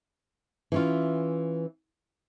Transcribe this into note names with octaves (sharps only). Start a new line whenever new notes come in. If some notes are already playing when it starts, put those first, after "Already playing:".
E3 C#4 F4